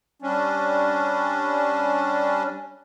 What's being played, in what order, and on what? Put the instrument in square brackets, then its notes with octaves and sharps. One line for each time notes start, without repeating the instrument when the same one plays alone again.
[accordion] G3 C#4 D4